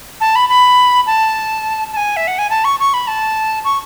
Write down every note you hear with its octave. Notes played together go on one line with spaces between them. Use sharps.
A5
B5
B5
A5
A5
G#5
E5
F#5
G#5
A5
C#6
C#6
B5
A5
C#6